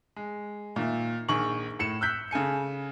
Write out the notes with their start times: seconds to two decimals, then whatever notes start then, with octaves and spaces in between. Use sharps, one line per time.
0.16 G#3
0.76 A#2 D#3 E5
1.29 A#1 D#3 G#4 C#6 F#7
1.79 A2 C#7 E7
2.01 E6 F#6 G6 B6
2.31 C#3 A4 G#5 C#7